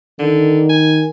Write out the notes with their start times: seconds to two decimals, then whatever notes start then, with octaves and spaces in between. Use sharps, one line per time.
0.19 D3 D#3
0.69 G#5